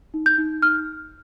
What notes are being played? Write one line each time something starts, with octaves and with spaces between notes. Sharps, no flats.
D#4
G6
D#4
D#4 F6